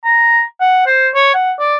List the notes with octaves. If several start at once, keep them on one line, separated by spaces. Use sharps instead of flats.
A#5
F#5
C5
C#5
F#5
D5